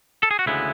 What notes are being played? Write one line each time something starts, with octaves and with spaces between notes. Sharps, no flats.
A4
G#4
F#4
D2 C#3 E3 G#3 B3 E4